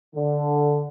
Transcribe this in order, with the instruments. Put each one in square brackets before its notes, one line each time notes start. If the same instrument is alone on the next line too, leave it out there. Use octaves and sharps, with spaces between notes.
[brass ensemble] D3